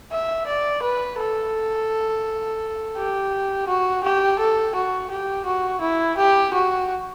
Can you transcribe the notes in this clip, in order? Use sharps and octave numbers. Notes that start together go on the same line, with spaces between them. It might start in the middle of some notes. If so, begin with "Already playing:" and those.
E5
D5
B4
A4
G4
F#4
G4
A4
F#4
G4
F#4
E4
G4
F#4